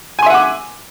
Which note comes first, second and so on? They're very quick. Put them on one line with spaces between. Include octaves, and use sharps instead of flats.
G#5 C6 E5 F#5 D6